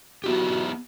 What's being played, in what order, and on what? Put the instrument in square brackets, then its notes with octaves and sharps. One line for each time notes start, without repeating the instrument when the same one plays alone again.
[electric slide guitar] B3 E4 G4 [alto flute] F#4